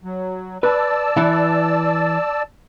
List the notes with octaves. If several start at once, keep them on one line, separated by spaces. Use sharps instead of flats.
F#3
B4 D5 A5 E6
E3 E4